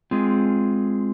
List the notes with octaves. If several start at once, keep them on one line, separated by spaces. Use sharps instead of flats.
G#3 C4 F4 G#4